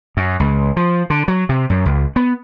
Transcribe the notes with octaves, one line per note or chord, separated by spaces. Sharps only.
F#2
C#2
F3
D3
F#3
C3
F#2
C#2
B3